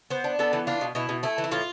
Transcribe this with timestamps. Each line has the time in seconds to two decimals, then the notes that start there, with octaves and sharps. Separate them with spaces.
0.10 B3 C5
0.24 D4
0.39 B3 A4
0.53 E3
0.67 D4 F4
0.81 B2
0.95 B2 E4
1.09 B2
1.23 A3 E4
1.38 E3
1.44 E4
1.51 A2 F4